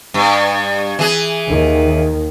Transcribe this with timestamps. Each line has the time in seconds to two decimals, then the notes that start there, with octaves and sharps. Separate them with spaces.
0.14 G2
0.99 E3 G#4
1.47 D#2 D#3